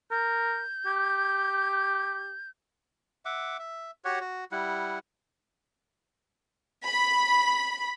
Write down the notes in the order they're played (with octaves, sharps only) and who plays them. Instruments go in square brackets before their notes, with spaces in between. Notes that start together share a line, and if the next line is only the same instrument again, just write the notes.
[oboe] A#4 [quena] G6
[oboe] G4
[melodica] E5 F#5 D6
E5
F#4 G4 C#5 F#5
F#4
G3 E4 F#5
[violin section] B5